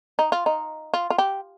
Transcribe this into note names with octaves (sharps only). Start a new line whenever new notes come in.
D#4
F4
D#4
F4
F4
G4